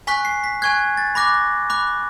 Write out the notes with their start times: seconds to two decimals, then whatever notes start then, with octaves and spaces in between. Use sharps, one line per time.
0.07 G#5 C#6 F#6 B6
0.25 C7
0.44 B6
0.62 G#5 C#6 F#6 G#6
0.97 A6
1.15 B5 D6 F#6 A#6
1.70 B5 D6 F#6